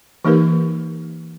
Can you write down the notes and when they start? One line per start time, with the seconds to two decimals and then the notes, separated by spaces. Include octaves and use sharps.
0.25 E3 A#3 D#4 G4 A#4 B4